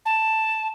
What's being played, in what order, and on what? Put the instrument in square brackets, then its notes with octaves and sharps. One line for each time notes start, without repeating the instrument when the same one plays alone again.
[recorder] A5